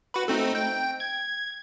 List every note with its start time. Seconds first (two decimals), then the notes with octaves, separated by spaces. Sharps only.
0.14 F#4 B4
0.28 A3 C4 D#4
0.55 G5
1.00 G#6